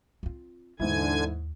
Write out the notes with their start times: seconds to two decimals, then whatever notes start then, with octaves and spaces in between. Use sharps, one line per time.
0.23 C4 F4
0.80 D#2 G#2 D3 E3 E4 G#5 G#6